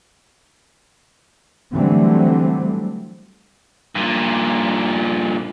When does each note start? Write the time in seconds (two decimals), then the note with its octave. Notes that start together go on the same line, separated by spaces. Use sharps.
1.73 D3 E3 F#3 G3 A3 C4
3.95 G2 A#2